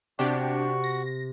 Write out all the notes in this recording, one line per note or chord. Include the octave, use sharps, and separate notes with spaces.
C3 D4 F#4 G4 C#6
A#6